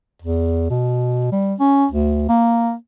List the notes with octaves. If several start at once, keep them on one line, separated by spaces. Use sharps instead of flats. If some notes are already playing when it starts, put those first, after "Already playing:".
E2
B2
G3
C#4
D2
A#3